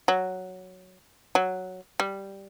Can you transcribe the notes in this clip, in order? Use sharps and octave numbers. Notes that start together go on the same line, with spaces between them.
F#3
F#3
G3